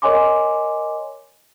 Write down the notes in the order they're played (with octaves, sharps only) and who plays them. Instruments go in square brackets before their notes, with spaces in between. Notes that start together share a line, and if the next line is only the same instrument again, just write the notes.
[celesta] A#4 C#5 D#5 G#5 C6 D6